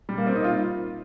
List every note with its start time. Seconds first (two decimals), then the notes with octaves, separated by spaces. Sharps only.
0.09 G3
0.18 A#3
0.27 C4
0.36 D#4
0.44 F4